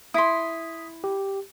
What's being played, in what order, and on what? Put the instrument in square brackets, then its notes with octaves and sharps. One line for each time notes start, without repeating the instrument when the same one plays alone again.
[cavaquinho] E4 C6 [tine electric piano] D#6 B6
[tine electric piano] G4